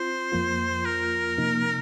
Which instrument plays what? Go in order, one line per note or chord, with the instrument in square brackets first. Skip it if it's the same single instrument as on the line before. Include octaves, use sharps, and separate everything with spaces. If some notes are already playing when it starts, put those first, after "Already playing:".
Already playing: [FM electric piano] C4 F4 [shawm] C5
[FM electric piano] F2 F3 A#3 F4
[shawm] A#4
[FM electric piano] C3 F3 A#3 D#4